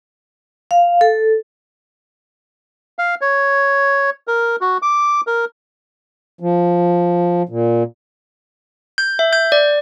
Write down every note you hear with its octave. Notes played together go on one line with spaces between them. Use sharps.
F5
A4
F5
C#5
A#4
F#4
D6
A#4
F3
A#2
G6
E5
G6
D5